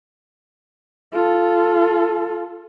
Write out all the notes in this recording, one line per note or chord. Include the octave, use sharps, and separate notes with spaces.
F4 A4